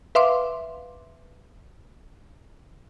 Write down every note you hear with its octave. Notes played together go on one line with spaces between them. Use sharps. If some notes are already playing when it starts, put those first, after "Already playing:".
B4 E5 F5 C6 D6